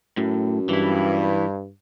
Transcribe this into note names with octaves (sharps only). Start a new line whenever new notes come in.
F#2 A2
G2 E3 E4